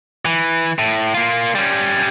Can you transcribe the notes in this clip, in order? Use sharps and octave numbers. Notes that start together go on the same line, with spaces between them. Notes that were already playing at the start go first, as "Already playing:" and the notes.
E3
A2
A#3 F4
G3 C#4